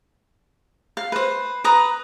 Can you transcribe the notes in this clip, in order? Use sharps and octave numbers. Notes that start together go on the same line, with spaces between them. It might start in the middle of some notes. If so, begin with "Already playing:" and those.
F5
B4 C5
B4 A#5 D#6